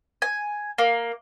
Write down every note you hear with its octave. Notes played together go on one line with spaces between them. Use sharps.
G#5
A#3